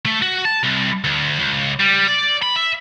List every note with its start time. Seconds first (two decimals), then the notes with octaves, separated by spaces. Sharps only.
0.05 A3
0.22 F#4
0.45 A5
0.63 C2
1.04 D2
1.39 C#2
1.80 G3
2.08 D5
2.43 B5
2.56 E5